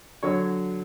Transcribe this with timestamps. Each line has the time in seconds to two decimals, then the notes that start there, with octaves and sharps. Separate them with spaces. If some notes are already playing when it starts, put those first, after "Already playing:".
0.23 D3 F#3 C#5